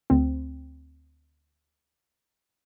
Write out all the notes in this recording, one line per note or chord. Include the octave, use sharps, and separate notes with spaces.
D2 C4